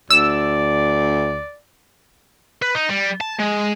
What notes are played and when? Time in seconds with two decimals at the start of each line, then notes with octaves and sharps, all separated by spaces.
0.10 D2 D5 E6
2.62 B4
2.75 D#4
2.89 G3
3.21 A5
3.40 G#3